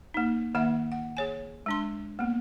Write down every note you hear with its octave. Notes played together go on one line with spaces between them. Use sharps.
A#3 D#4
D#3 A#3 E5 F#5
F#5
G#4 C#5 G#5
G#3 D4 C6
A#3 B3